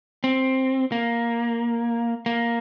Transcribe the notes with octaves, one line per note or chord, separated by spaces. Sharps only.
C4
A#3
A#3